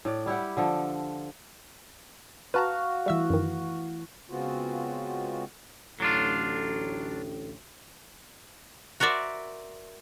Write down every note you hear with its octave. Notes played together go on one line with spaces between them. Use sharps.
A2 D5
G3 E4 G4 F#5
D3 F3 A4
F#4 B4 F5 A5 A#5
E3 G3 A3 E5 E6
F#2 D#3
C#3 G#3 B3 C4 F4 F#4
A1 D2 A2 F#3 D4 F4
F#4 A#4 C5 D5 E5